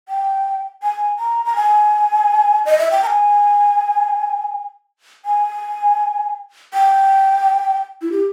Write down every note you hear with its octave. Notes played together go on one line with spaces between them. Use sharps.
G5
G#5
A#5
A#5
G#5
D#5
E5
G5
A#5
G#5
G#5
G5
E4
G4